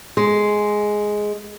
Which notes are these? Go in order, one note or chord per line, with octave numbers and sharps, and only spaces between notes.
G#3